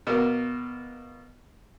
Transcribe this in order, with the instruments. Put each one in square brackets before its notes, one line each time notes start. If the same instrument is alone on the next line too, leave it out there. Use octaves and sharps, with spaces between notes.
[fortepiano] B2 A#3